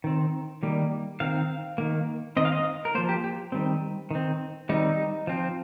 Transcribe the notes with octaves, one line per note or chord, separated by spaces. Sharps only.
D#3 C4
D#3 G3 A#3
D#3 C4 F5
D#3 A#3
D#3 C4 D#5
F5
D#5
A#4
F3 A#3 C5
G4
G4
D#3 G3 C4
D#3 C4
D#3 G3 C4 D#4
F3 C4